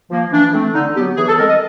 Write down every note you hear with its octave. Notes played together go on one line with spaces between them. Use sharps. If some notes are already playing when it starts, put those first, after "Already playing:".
F3 A#3
E3 D4
A3 C4
D3 D#4
F#3 B3 G4
E3 G#4
A4
G#3 C4 A#4
D#5